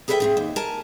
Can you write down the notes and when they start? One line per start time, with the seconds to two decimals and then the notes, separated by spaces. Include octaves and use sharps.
0.08 G#4 A4 B4 C5 E5 G5
0.20 A3 C4 G#4
0.37 D#2
0.56 A#4 G#5 A5